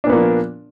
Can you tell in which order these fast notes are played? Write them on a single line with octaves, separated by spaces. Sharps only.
D4 A#2 B3 A#3 F3